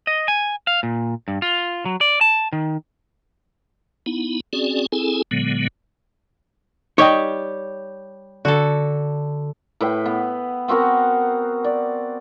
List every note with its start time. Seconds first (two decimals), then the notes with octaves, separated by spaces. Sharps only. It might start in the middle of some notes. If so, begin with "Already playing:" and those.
0.07 D#5
0.28 G#5
0.67 F5
0.83 A#2
1.28 G2
1.42 F4
1.85 F#3
2.01 D5
2.21 A5
2.53 D#3
4.06 B3 D#4 E4
4.53 C4 C#4 F#4 G#4 D5
4.92 C4 E4 G#4 A4 G#5
5.31 A#2 D3 F#3 G#3 B3
6.98 G3 D#4 G4 C#5 D#5 G5
8.45 D3 F#4 A4
9.81 A2 B4 G5
10.06 B3
10.68 B3 C4 F#4 A#4
11.64 D5